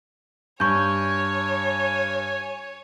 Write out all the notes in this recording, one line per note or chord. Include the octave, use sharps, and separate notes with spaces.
G2 C#5 G#5 C#6 G6